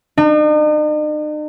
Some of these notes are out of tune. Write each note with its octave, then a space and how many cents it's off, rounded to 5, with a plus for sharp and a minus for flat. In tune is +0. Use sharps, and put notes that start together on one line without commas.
D#4 -45